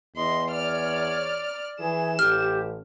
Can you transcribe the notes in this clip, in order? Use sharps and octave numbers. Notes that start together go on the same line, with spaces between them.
E2 D#5 C6
C#5 D5 F6
E3 G#4 E7
A1 G4 F6